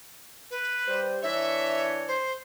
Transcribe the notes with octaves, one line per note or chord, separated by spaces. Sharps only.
B4
G3 C5
E3 D4 C#5 E5
C5